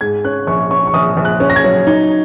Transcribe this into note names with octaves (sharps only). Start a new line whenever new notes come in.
G#2 G#6
C#4 F#6
A#1 C#6
C#4 C#6
C#6
A#1 D#6
A#1
F#6
C#4
A#6
G#6
F#3
D#4